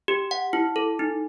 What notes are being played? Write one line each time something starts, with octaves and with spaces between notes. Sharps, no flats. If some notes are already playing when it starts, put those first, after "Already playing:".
G4
F#5
E4
A4
D#4